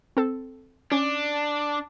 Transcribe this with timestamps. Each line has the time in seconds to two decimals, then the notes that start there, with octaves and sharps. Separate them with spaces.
0.17 C4 A4
0.92 C#4 D4